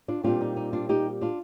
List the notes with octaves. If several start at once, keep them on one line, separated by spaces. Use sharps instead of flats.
D4 F4
A#2 G3 C4 D4 F4
D#4
D#4
D4 F4
D#4 G4
D4 F4